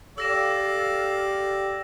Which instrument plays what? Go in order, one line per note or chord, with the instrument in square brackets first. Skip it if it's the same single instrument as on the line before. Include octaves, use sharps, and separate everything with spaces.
[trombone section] G4 [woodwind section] A4 F5 [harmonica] D5 [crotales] E6 A#6 E7